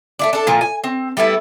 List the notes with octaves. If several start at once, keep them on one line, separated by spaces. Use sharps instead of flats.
A3 E4 D5
D4 A4
A#2 F3
G#5
C4
G3 A3 B3 E4